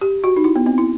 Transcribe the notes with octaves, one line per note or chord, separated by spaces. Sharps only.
G4
F#4
D#4
E4
B3
C4
E4